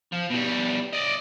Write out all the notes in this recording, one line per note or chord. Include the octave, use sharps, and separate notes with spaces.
F3
B2 G3
D5 D#5